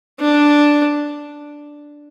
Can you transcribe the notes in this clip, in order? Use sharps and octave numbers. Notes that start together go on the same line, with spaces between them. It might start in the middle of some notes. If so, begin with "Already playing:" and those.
D4